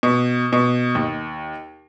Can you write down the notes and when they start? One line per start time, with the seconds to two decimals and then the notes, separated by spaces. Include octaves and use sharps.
0.03 B2
0.53 B2
0.95 D#2